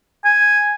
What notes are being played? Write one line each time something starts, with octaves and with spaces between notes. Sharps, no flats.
G#5